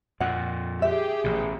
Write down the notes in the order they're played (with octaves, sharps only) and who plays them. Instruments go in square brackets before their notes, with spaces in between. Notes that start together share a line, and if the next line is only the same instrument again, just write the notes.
[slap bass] F2 A#2 [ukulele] F#5
[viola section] G4 G#4 [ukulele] E5
[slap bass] A1 B2